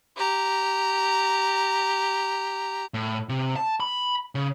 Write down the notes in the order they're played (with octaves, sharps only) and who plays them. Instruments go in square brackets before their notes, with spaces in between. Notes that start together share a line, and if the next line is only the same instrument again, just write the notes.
[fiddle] G4 A#5
[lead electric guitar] A2
C3
A5
B5
C#3